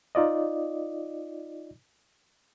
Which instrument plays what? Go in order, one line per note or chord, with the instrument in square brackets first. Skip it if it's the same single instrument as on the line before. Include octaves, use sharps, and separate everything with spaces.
[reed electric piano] D#4 F4 D5 D#5